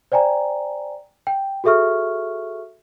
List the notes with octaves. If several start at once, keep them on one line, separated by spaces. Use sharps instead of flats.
C5 D5 G5 G#5 A#5
G5
F#4 G#4 A4 E5 C#6 F6